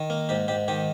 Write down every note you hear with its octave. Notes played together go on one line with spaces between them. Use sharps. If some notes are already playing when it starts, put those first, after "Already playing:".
Already playing: D#3
A#3
G#2 G4
G#2 G4
D#3 G4